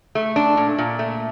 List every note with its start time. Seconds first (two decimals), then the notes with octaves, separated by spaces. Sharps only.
0.15 A3
0.36 D4
0.57 A#2
0.78 A#2
0.99 A3